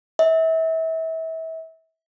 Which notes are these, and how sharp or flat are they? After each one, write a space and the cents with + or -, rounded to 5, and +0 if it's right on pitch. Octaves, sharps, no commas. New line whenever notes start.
E5 -30